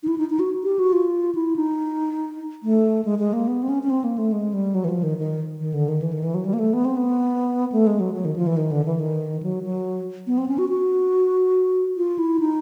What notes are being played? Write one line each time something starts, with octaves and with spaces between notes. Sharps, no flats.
D#4
E4
D#4
D#4
F#4
G4
F#4
F4
E4
D#4
A3
G#3
G#3
A#3
B3
C4
C#4
C#4
C4
A#3
A3
G#3
G3
F#3
E3
F3
D#3
D#3
D#3
D3
D#3
E3
D#3
E3
F#3
G3
A#3
A3
B3
C4
B3
A3
G#3
F#3
F#3
D#3
F3
E3
D#3
D3
E3
D#3
F#3
F#3
B3
C4
C#4
F#4
F#4
F4
E4
D#4